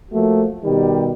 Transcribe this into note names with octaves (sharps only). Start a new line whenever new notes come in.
F3 A3 A#3 F#4
B2 D#3 G3 G4